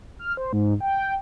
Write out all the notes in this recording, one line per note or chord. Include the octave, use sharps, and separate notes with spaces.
F6
C5
G#2
G5